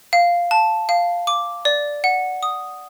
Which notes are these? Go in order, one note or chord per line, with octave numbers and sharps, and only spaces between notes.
F5
A5
F5
D6
D5
F#5
D#6